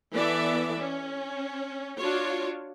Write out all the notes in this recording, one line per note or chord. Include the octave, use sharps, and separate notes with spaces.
E3 B3 A4 D5 E5
C#4
D4 F4 F#4 C#5